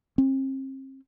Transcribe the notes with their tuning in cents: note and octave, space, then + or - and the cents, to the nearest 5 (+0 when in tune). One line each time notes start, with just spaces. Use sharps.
C4 +40